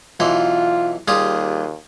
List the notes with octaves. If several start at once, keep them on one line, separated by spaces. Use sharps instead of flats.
B1 E3 F4 C6
D#2 G3 F4 G#4